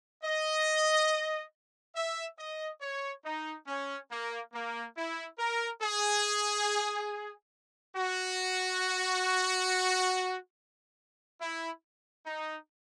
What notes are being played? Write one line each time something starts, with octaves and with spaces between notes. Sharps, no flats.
D#5
E5
D#5
C#5
D#4
C#4
A#3
A#3
E4
A#4
G#4
F#4
E4
D#4